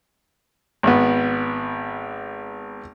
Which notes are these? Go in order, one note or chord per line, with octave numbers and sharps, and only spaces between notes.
G#1 B3